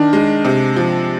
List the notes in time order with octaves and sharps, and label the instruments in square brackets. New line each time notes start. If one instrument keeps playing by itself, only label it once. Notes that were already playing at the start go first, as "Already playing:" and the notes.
Already playing: [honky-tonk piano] D#3 [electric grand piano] D4
[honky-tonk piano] G#3
C3
F3